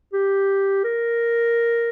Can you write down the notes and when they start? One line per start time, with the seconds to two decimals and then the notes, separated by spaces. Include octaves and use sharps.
0.13 G4
0.84 A#4